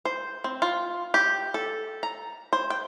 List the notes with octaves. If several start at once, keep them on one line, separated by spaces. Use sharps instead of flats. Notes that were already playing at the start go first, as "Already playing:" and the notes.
C5
C4
F4
G4
A4
A#5
C5
G5